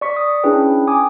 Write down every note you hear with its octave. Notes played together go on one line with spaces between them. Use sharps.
D5 C#6 B6
D#6
C#4 D4 E4 G#4 B4 G5
G5 G#5 D6 D#6